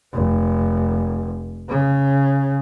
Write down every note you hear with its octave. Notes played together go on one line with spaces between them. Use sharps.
F1
C#3